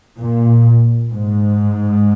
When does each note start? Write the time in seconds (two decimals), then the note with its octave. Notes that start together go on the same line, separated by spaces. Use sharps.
0.19 A#2
1.11 G#2